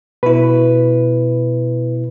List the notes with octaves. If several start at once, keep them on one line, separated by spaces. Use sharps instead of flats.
B2 E4 B4